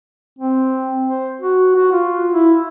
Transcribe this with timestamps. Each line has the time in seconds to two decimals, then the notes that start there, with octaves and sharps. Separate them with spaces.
0.39 C4
1.06 C5
1.41 F#4
1.75 F#4
1.92 F4
2.33 E4